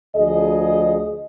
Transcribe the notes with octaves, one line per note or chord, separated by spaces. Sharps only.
D2 F3 G#4 D#5